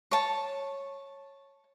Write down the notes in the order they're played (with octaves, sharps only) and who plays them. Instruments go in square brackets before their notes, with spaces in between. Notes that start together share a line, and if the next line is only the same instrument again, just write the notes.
[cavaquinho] C#5 A5